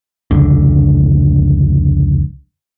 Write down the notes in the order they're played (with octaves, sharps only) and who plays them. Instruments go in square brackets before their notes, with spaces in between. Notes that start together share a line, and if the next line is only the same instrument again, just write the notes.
[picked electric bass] F1 C#2 D3